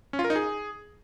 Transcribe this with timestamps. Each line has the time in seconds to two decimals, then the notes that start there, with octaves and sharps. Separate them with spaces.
0.13 C#4
0.19 F4
0.24 A#4
0.30 D#4
0.36 G#4